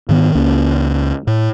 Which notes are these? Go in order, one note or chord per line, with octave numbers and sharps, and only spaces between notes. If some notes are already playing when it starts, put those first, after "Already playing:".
G#2 D#3 B3
C#2 A#3 C#4
A2